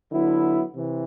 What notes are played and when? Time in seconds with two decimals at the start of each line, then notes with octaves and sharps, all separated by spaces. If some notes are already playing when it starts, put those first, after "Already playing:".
0.12 D3 F#3 B3 E4
0.76 C3 E3